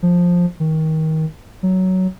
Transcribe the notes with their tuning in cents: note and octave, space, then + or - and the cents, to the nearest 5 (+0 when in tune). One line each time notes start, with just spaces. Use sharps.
F3 +10
D#3 +25
F#3 +10